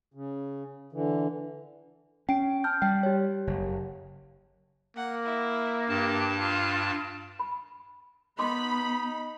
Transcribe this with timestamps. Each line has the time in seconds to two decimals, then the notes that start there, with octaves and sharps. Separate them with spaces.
0.14 C#3
0.92 D3 E3
2.29 C#4 G5 D7
2.64 A5 F6 G6
2.82 G3 G5
3.03 G4 C#5
3.47 F#1
4.97 A#3 F#5
5.26 E4
5.89 G2 G4 A5
6.40 F4
7.39 B5
8.39 B3 D#4 B5 C6 D6